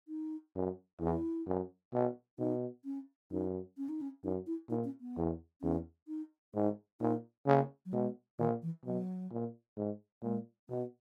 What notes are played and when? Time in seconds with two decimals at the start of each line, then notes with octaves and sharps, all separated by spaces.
0.08 D#4
0.55 F#2
1.00 E2 E4
1.47 F#2
1.93 B2
2.39 B2 D#4
2.85 C#4
3.31 F#2 D#4
3.78 C#4
3.89 D#4
4.01 C#4
4.24 F#2 D#4
4.47 E4
4.69 A#2 D#4
4.85 C#4
5.01 B3
5.17 E2
5.62 E2 C#4
6.08 D#4
6.54 G#2 D#4
7.00 A#2 D#4
7.46 C#3 A#3
7.86 F#3
7.93 B2 G#3
8.39 A#2 D#3
8.62 E3
8.85 B2 F#3
9.31 A#2
9.77 G#2
10.23 A#2 G#3
10.69 B2 B3